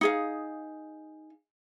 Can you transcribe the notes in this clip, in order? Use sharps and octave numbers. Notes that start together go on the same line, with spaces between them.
D#4 G#4 F5